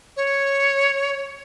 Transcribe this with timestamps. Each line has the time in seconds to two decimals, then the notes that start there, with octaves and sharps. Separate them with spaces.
0.16 C#5